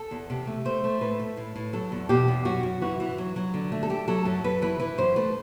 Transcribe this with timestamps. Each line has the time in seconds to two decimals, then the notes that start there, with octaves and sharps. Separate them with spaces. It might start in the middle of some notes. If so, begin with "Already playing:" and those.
Already playing: A4
0.11 E2
0.30 C3
0.47 A3
0.65 A3 C5
0.84 A3
1.01 A2 B4
1.20 A3
1.37 A2
1.56 A2
1.73 F#3 A4
1.92 E2
2.09 B2 G4
2.28 E2
2.45 F#2 F#4
2.63 F#2
2.81 E3 F#4
3.00 E3
3.18 F#3
3.36 F#3
3.54 D3
3.72 A3
3.83 A4
3.89 A3 G4
4.08 F#3 A4
4.25 F#2 A4
4.44 F#2 B4
4.62 E3 B4
4.80 E3 B4
4.98 F#2 C5
5.16 A3 B4